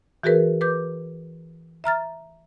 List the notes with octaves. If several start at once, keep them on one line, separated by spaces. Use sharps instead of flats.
E3 F#4 G#4 A#4 B4
B4 D6 G6
E5 A#5 F6 A6